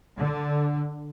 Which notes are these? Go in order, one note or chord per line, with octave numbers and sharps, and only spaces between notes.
D3